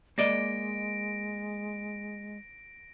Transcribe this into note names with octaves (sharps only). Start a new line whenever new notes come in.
G#3 A#3 D5 D#5 A#6 D7